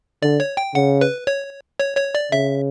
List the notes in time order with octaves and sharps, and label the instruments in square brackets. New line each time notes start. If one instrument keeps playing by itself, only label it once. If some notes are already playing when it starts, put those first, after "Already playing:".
[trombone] D3 [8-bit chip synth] D5
[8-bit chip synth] C#5
G5
[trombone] C#3 [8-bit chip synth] F#5
[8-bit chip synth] B4
C#5
C#5
C#5
D5
[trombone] C#3 [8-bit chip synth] E5